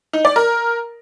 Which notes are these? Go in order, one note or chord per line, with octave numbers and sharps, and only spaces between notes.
D#4
D5
A#4